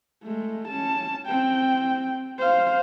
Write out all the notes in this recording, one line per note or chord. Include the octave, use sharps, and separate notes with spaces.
G#3 A3
C#4 A5
C4 G5
C5 F5